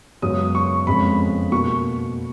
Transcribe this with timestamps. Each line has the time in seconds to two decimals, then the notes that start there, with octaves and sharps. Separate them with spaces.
0.22 F#2 C#3 G#3 B3 D#6
0.55 C#6
0.87 F2 C#3 G#3 B3 B5
1.52 B2 A#3 C#6